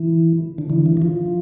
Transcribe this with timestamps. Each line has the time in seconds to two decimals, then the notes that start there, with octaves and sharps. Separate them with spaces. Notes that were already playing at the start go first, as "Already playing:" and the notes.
Already playing: E3
0.58 D3
0.70 E3
0.86 E3
0.97 E3
1.02 F3